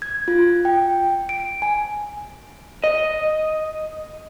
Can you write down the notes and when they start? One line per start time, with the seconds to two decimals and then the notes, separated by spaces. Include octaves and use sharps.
0.02 G#6
0.28 F4
0.65 G5
1.29 D7
1.62 G#5
2.84 D#5